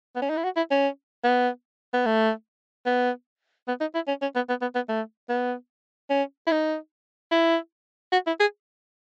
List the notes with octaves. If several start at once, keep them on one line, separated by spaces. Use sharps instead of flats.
B3
C#4
D#4
E4
F#4
E4
C#4
B3
B3
A3
B3
B3
D#4
E4
C#4
C#4
B3
B3
B3
B3
A3
B3
C#4
E4
D#4
E4
F#4
E4
G#4